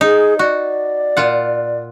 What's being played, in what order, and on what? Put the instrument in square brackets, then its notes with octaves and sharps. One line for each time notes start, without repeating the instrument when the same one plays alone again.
[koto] D#4 [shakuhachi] G#4
[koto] F#4 [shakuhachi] D5
[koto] A#2 F4 F#5